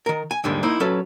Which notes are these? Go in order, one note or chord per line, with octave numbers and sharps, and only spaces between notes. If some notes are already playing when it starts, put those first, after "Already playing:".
D#3 A#4
G#5
D#2 G#2 D3 D#3 G3 G#3
A#3 D#4 E4 C5
F#3 C#4 A4 B4